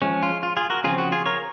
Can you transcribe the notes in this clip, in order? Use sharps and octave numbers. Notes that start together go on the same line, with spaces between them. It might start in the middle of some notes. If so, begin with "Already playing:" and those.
F3 G#3 C#4
F4
F4
F4 G#4
F#4 A#4
C#3 F3 C4 F4 G#4
F#4
F4 G#4
A#4 C#5